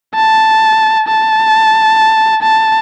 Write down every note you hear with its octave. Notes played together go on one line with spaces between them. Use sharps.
A5
A5
A5